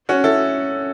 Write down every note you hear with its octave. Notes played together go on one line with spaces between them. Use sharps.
C#4 F#4
E4 A4